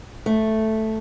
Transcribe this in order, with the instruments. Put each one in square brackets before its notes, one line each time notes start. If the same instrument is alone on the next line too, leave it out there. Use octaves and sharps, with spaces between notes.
[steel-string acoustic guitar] A3